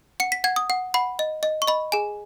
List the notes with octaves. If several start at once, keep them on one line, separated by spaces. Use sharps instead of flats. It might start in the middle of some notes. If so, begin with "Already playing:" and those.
F#5 C#7
B6
F#5 G#6
D#6
F#5
F#5 B5
D#5
D#5
C#6
D#5 B5
G#4 G#5